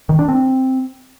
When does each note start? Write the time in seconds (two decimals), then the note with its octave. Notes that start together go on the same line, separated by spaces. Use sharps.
0.09 D#3
0.19 D4
0.28 C4